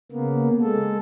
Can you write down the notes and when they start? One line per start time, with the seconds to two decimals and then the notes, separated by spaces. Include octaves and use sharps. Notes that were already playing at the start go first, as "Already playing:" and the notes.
0.12 C#3 A#3 B3
0.62 G#3 A4